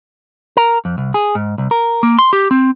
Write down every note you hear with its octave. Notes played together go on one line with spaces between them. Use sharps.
A#4
F2
C2
G#4
G#2
C2
A#4
A#3
C6
G4
C4